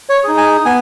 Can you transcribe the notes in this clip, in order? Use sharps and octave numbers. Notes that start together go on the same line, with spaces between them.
C#5
D#4 G#4
G#5
B3 G#5